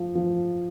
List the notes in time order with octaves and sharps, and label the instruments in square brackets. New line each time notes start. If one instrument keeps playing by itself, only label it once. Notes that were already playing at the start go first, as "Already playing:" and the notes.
Already playing: [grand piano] F3
F3